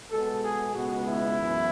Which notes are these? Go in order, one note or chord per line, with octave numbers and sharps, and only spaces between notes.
B2 G#3 B3 A4
G#4
C#2 B2 G#3 B3 F#4
E4
F#2 E3 B3